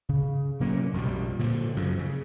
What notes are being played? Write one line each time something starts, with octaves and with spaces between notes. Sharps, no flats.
C#3
C3 F#3 A#3 C#4
A#1 F2 B2 G3
A#2 D3 F3
F#2 C#3
C#3